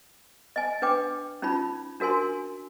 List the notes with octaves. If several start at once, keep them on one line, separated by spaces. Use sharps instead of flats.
D#5 G#5
D4 B4 G5 D6
C#4 D#4 F4 B5
D4 F#4 A#4 G#5 C6